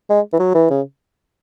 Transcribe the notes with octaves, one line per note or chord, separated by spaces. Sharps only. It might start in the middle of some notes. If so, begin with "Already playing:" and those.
G#3
E3
F#3
E3
C#3